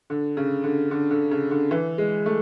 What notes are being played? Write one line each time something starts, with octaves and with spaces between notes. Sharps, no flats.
D3
C#3
D3
D3
D3
C#3
D3
E3
G#3
A3